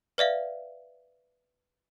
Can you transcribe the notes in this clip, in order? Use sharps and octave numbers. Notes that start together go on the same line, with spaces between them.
B4 D5 E5 F5